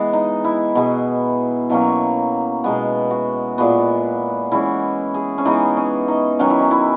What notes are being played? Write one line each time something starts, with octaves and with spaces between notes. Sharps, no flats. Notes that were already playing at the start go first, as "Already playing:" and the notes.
Already playing: E3 G#3 B3
D#4
E4
B2 G#3 B3
B2 F#3 A#3 C#4 E4
B2 G#3 B3
F#4
A#2 G#3 B3 F#4
E3 G#3 C#4 E4
G#4
C#4
E3 G#3 B3 D#4
C#4
D#4
D#3 F#3 C#4 F#4
E4
D#4
E4